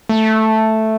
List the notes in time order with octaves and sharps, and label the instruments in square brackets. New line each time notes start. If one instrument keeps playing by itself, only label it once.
[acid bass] A3